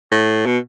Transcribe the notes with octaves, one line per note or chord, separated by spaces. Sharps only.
A2
B2